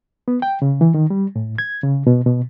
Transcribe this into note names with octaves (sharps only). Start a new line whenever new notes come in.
B3
G5
C#3
E3
D#3
G3
A2
G#6
C#3
B2
B2